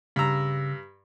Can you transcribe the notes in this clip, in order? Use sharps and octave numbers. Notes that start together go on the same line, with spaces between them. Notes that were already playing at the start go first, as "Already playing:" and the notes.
G2 C#3 A#5 E6